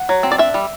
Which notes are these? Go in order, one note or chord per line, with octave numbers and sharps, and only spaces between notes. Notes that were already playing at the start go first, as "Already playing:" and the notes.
Already playing: F#5
F#3
C4
D5
D4 E5
G3